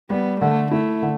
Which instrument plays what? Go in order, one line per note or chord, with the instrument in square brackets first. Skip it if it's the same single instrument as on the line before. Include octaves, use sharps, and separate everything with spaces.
[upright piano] G3 [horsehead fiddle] B3
[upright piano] D3 [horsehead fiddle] A3
[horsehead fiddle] A3 [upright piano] E4
[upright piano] D3